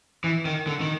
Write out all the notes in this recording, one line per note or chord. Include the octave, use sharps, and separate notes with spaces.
E3
D#3
D3
D#3